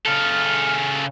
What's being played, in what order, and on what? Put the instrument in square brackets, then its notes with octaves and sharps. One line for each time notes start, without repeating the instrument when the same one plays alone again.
[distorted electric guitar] C#3 A4 [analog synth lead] F6